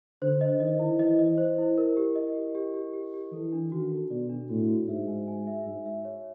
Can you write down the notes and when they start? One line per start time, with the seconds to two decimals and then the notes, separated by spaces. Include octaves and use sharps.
0.22 D3 C5
0.41 D#5
0.60 D#3 D#5
0.79 E4
0.99 E3 D#5
1.19 D#5
1.38 C5
1.58 E4
1.78 A#4
1.97 G4
2.16 D#5
2.35 G4
2.55 G4
2.74 G4
2.93 G4
3.14 G4
3.32 E3 A4
3.53 D4
3.72 D#3 F#4
3.91 A4
4.11 B2 D5
4.29 D4
4.49 A2 F#4
4.69 F#4
4.88 G#2 E5
5.08 G#5
5.28 G#5
5.47 E5
5.66 G#2 E5
5.86 E5
6.05 C#5